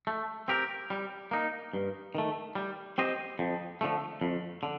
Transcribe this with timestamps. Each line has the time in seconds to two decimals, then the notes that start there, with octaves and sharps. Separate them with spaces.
0.07 A3
0.48 C4 G4 A#4
0.90 G3
1.31 A#3 D#4
1.73 G2
2.15 D#3 A3
2.55 G3
2.98 C4 G4 C5 D#5
3.39 F2
3.81 D3 F3 A3
4.21 F2
4.63 D3